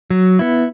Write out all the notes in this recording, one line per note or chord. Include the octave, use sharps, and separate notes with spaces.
F#3
B3 E4